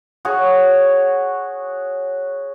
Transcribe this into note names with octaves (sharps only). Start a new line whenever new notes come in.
F#4 G#4 C#5